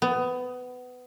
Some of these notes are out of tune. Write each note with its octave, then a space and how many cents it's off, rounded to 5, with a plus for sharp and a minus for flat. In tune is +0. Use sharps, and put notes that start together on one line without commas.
B3 +20